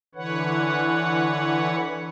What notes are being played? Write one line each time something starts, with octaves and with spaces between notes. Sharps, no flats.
D3 E3 B4 C#5 F#5